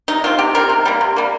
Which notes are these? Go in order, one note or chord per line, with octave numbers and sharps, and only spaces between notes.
C3 D#4
D#3 C4 F4
C3 G4
D#3 C4 A#4
C3
G3 A#3
C3
G3 A#3